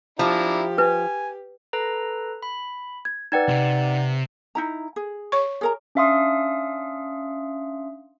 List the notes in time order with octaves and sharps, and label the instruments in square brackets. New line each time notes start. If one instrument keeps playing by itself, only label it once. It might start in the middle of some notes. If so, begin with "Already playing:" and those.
[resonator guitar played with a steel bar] F3 [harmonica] D4 E4 A#5 [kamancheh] G4
[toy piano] B4 [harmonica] G#5
[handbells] A4 B4 A#5
B5
[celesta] G#6
[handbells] D#4 D5 F#5 [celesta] B4 G5 G#6
[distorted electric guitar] C3
[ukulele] D#4 E4 A#5
G#4
[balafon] C#5 C#6
[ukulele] G#4 A#4 A#5
[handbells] C#4 D4 E5 F5 C6 D#6